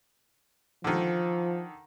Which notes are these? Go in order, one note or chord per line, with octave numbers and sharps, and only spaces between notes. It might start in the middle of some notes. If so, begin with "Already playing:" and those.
D3 D#3 F3